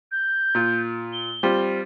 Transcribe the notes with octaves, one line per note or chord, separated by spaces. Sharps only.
G6
A#2 F4
G7
G3 C4 F4